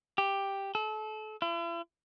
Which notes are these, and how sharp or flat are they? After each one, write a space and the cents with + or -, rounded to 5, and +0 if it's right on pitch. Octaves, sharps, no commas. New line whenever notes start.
G4 +5
A4 -30
E4 +45